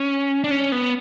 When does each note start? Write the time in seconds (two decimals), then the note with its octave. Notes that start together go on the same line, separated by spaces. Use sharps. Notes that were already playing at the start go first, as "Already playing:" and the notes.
Already playing: C#4
0.44 D4
0.51 C#4
0.72 B3